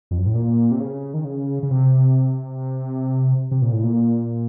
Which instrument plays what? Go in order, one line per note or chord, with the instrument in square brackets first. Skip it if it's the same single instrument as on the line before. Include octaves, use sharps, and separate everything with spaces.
[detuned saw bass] F2
F#2
A2
A#2
C3
C#3
D#3
C#3
C#3
C3
C3
A#2
A2
A#2